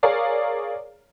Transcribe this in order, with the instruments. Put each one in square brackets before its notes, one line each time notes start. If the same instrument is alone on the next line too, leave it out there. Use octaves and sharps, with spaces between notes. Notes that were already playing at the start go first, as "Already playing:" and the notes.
[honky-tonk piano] G#4 A#4 C#5 D5 F5 A#5